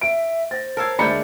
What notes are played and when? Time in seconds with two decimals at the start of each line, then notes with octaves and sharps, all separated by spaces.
0.01 E5 D7
0.51 C5 A6 A#6
0.77 A#4 C#5 F5 A5 E6 G#6
0.99 D2 D#3 G#3 D4 E5 B5 G6 C#7